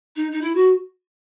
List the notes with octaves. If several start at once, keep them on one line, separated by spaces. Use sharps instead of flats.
D#4
D#4
E4
F#4